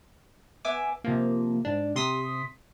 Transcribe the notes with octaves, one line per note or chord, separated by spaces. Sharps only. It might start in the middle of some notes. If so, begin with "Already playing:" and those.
B3 E5 G#5 D6
C3 F3 A#3
G#2 D4
C3 C6 D#6 B6